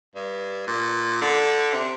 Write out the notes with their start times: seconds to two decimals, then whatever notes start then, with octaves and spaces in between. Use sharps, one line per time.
0.15 G2
0.67 A#2
1.21 D3
1.73 C3